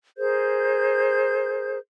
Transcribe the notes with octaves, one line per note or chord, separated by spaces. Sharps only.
G#4 A#4 C5 G6